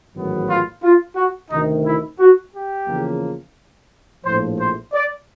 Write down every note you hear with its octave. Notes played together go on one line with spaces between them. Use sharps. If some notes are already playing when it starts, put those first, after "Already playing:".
A1 G#2 D#3 F#3 B3
F4
F4
F#4
D2 C3 D#3 D#4
E4
F#4
G4
E2 C#3 F3 A#3
A#1 A2 F3 C5
C5
D5